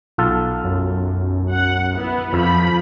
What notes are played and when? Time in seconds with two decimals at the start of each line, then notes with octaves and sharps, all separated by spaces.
0.18 B1 F4 A4
0.64 F#2
1.51 F#5
1.96 B3 E4
2.33 F2 F3 B5